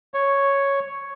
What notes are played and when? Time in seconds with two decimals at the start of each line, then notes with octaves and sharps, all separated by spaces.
0.14 C#5